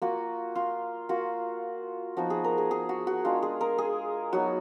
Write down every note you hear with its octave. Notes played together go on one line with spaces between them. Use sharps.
A#3 F4 F#4
F4
A#3 F4 F#4
F3 B3 D#4 F#4
G#4
A#4
G#4
G#4
F#4
F#4
G#3 D4 F4
G#4
A#4
G#4
F#3 B3 D#4 F#4